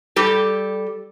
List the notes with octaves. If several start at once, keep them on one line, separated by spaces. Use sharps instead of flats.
G3 G4 A4